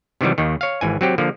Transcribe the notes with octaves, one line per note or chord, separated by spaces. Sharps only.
C3 D#3 E3 F#3 G3
D#2 D#3
C#5 F5
G#1 E3 G#5
F#3 C4 G4
D3 F3 A#3